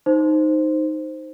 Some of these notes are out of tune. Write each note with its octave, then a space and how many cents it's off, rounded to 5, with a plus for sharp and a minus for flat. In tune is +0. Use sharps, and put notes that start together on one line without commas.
D#4 +0 C5 +0